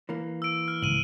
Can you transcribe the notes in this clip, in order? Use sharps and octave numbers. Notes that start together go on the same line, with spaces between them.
E3 A#3
E6 D7
F6
G#1 C#2 D#7 F#7